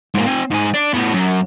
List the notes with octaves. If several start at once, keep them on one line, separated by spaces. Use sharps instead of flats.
G#2 A#3
C4 G#5
G#2 G#4
D4
A2 B3
F#2 F#3